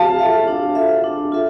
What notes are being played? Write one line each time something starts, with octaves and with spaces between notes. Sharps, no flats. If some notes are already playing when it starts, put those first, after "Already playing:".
Already playing: F5 A5
F4 A4 E5
D4
F4 A4 E5
D4
F4 A4 E5